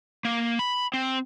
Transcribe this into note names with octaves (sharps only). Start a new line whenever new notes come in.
A#3
B5
C4